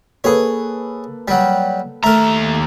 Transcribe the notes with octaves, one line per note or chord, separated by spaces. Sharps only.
A#3 G#4 A4 B4 C#5
F#3 G3
D#2 A3 A#4 A#5